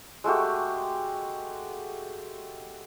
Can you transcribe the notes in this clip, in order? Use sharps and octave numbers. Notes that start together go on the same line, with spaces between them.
G#3 A3 F#4 G4